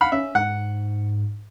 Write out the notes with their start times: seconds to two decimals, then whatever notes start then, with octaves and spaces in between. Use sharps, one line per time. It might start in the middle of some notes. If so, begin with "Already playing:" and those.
0.01 F5 F#5 B5
0.12 C#4 E5
0.35 G#2 F#5